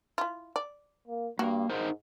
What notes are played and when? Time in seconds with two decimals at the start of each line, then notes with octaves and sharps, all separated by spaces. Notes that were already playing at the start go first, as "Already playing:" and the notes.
0.18 E4 F4
0.56 D5
1.08 A#3
1.39 G2 A#3 F#4
1.70 G#2 D#4 A#4 C5